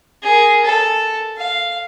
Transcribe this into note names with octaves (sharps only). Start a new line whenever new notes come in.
G#4 A#4
A4
F5